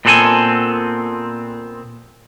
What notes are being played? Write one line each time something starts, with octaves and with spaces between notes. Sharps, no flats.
A#2 B3 C4 A4 C5 G#5